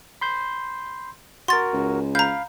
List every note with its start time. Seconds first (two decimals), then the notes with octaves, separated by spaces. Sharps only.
0.21 B5 C6 G6
1.48 F#4 A#4 C6 A6
1.73 C#2
2.15 F5 A#5 B5 G6